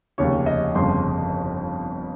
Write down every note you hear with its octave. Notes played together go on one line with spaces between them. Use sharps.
F1 D#2 C#3 C#5
D#5
G1 F2 C#3 C6